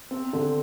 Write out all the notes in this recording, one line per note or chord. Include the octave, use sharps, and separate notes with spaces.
C4
D3